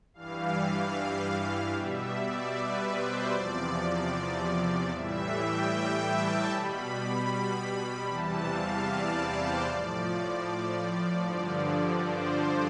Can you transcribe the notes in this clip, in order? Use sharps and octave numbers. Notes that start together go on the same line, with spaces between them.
G2 E3 G3 F5
B2 G3 E5
D5
B4
C5
E2 C3 F3 D5
A2 E3 G3 E5
G5
G5
A5
B2 G3 B5
E2 C3 E3 G3 A5
F5
D5
C5
A2 F3 D5
G2 D3 F3
C5